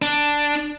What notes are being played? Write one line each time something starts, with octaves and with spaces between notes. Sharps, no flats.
D4